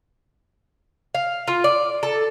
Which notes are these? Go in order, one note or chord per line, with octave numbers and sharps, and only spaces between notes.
F5
F4
D5
A4